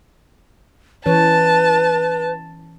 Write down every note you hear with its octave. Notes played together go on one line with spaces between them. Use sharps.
E3 C#4 B4 C#5 A5